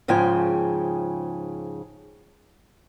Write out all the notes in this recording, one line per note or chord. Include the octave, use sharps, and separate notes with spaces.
G#2 C#3 F3 G5 G#5